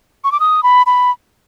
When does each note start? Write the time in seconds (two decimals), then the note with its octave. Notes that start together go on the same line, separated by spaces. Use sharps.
0.24 C#6
0.32 D6
0.40 D#6
0.63 B5
0.86 B5